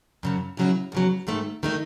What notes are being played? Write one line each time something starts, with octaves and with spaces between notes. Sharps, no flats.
F#2 C#3 F#3
F#2 C#3 F#3 C#4 E4
E2 C#3 F#3
G#2 D#3 A3
D#3 A3 D#4